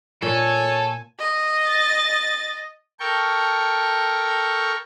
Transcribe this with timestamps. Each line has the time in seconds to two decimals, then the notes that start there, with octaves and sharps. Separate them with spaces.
0.22 A#2 A4 C#5 G#5 A5
1.19 D#5
1.68 A6
3.00 A4 A#4 G5 C#6